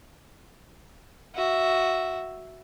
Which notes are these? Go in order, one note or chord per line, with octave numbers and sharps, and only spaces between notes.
F#4 E5